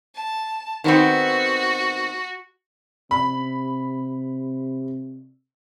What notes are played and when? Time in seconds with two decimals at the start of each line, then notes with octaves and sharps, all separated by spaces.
0.15 A5
0.84 D#3 B3 C4 F#4
3.11 C3 B5